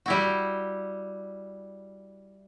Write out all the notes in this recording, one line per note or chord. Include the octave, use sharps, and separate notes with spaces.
G3 E4 F#4